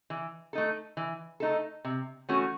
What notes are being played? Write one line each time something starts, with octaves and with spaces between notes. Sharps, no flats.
E3
A3 D#4 A4
E3
A3 D#4 A4
C3
E3 A3 C#4 F#4